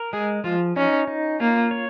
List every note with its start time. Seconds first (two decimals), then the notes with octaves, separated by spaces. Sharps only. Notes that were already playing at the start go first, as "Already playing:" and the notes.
Already playing: A#4
0.13 G#3 G#4
0.44 F3 F4
0.76 C#4 D#4
1.07 D#4
1.40 A#3 F4
1.71 C#5